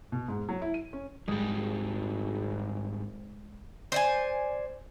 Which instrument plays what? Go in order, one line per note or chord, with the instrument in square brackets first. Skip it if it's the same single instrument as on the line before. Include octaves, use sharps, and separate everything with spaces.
[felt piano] B2
G#2
F#3
E4
D#7
C#4
[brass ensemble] G#1 [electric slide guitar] G#2 G3 [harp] G#3
[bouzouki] C5 D5 G#5